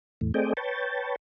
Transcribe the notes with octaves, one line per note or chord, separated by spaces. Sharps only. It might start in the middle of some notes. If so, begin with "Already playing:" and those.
E2 A2
A3 C4 G#4 D5 D#5 G5
B4 C#5 G5 A5